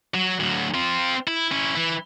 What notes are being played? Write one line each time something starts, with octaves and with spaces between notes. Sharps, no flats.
F#3
D2 F#3
C4 F4
E4
C#4 E4
E3 E4